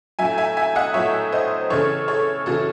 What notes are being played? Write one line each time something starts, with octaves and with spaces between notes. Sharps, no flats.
A2 F#3 E5 G#5
E5 G#5
E5 G#5
D#5 F#5
A2 F#3 C#5 E5
C5 D#5
C#3 E3 A4 C#5
A4 C#5
C#3 E3 F#4 A4